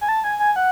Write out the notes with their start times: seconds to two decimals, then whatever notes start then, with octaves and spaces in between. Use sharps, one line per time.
0.01 G#5
0.09 A5
0.24 G#5
0.39 G#5
0.56 F#5